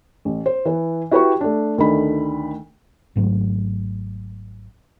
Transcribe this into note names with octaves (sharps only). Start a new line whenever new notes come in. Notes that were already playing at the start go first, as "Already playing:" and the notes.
A1
C5
E3 B4
E4 F#4 G4 B4 G5 C#6
A3 D4
D2 D#3 A3 D4 B5
G#1 G#2 F#3 A3